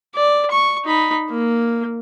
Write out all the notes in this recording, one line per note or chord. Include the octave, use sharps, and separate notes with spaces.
D5
C#6
D#4 B5
A#3